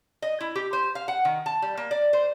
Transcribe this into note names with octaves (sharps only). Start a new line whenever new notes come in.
D#5
E4
G4
C5
F5
F#5
D#3
A5
G3
A#3
D5
C5